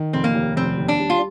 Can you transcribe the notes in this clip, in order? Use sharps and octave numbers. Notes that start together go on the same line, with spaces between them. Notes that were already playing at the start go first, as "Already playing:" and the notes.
Already playing: D#3
F1 C4
A#3
D#2
F1 C4
D#2
D4
G3
F4